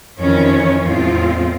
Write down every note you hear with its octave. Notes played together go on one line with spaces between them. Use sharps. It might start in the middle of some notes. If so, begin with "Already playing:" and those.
F2 D#3 E3 C#4 C#5
E2 A2 G#3 C4 F4